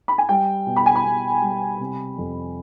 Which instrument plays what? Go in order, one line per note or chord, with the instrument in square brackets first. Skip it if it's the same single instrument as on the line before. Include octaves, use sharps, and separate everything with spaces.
[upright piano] B5
G#5
G3 G5
B2
B5
G#5
B5
B2
G3
C3
F2